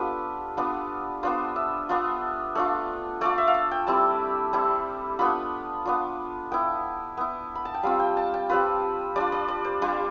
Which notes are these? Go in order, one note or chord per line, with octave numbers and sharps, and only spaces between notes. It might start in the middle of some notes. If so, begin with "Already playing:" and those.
Already playing: B3 D4 F4 G4 A4 B4
B3 D4 F4
B3 D4 F4 C5
E5
B3 D4 F4
A3 D4 F4
A3 D4 F4 D5
E5
F5
E5
G5
G3 C4 E4 A5
G3 C4 E4
B3 D4 F4 B5
B3 D4 F4
B3 E4 G5
B3 E4
B5
A5
G5
G3 C4 F4 F5
G5
A5
G5
G3 C4 F4 B4
G3 D4 F4 D5
D5
D5
C5
G3 D4 F4